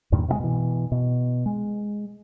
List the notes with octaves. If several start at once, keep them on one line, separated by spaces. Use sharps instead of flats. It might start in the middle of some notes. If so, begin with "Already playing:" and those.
E2 G2 A#2 D#3
C3 D#3 G#3
B2 E3
B2
G#3